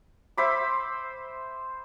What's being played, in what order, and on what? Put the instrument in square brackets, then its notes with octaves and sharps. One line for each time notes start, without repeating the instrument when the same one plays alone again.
[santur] C5 E5 B5 D6